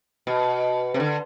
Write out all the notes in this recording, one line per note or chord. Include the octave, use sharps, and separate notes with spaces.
B2
C3
D3